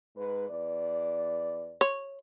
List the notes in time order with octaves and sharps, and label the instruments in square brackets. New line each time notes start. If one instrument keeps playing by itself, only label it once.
[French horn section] G#2 B4
E2 B4 D5
[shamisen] C#5